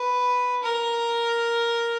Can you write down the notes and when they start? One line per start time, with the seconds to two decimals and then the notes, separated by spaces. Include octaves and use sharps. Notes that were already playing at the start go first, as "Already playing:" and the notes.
Already playing: B4
0.63 A#4